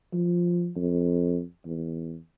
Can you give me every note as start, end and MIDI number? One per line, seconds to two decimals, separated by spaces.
0.13 0.70 53
0.76 1.42 41
1.66 2.16 40